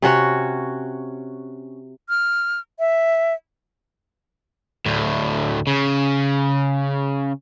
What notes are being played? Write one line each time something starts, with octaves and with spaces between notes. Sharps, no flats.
C3 C#4 F#4 C#5
F6
E5
D2 A2
C#3